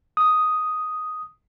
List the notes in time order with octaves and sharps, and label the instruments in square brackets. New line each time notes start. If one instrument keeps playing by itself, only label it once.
[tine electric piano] D#6